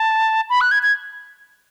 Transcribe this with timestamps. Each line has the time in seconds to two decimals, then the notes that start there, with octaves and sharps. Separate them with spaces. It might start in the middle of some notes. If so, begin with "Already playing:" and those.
Already playing: A5
0.50 B5
0.61 F#6
0.71 G#6
0.83 G#6